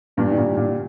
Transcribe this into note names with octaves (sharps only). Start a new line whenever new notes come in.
G2 A#2 G3
D#3
A#2 D3
A#2 D3